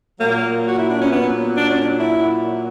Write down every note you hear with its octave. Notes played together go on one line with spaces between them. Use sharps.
A#2 F#3 A#3
F#4
E4
D4
C#4
B3
D4
C#4
D4
E4